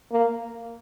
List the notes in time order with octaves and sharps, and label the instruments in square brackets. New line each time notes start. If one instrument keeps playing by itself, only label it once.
[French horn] A#3